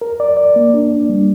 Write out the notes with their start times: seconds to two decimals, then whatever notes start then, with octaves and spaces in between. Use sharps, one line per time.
0.01 A#4
0.20 D5
0.37 D5
0.56 A#3
0.74 D4
0.92 D4
1.09 G3